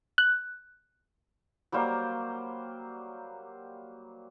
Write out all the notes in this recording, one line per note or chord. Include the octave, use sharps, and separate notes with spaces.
F#6
F#3 G3 A#3 C5